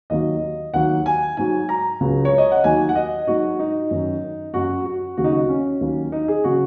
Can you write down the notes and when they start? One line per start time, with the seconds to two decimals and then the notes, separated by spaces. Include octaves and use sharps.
0.10 D#2 D#3 F#3 D#5
0.74 D#2 D#3 F#3 F#5
1.06 G#5
1.37 G#2 F#3 G#5
1.69 A#5
2.00 C#2 C#3 F#3
2.25 C#5
2.38 D#5
2.52 F#5
2.64 D#2 D#3 F#3 G#5
2.89 F#5
2.95 D#5
3.27 G#2 F#3 F#4
3.59 D#4
3.91 F#2 D#3 F#3
4.54 F#2 F#3 F#4
4.85 F#4
5.17 D#2 C#3 F#3 F#4
5.24 D#4
5.31 F#4
5.49 C#4
5.81 D#2 D#3 F#3
6.12 D#4
6.28 G#4
6.44 C#3 F#3 F#4